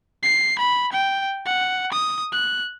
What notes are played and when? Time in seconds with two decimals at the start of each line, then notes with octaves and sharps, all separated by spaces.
0.23 C7
0.59 B5
0.92 G5
1.46 F#5
1.92 D#6
2.33 F#6